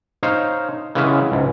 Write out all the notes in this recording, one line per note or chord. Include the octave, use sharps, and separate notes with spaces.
D#4 C5 C#5 F5
C#3 E3 G#3 B3 C#4 E5
C#2 G#2